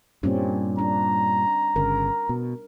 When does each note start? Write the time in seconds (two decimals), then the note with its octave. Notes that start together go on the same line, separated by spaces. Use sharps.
0.23 G2 A#2 G3 C4 C#4
0.79 D4 A#5
1.76 G1 C#3 A#4
2.29 B2